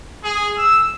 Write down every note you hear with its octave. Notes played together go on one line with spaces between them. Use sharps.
G#4
E6